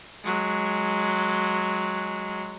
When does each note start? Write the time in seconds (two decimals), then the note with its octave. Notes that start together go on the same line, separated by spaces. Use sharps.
0.24 F#3 G#3